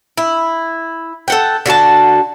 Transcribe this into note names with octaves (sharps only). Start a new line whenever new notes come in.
E4
A4 F#5 G5
D3 F#4 C5 A5